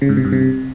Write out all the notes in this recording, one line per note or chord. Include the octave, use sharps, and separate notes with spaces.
C#3
G#2
C3
G2
C3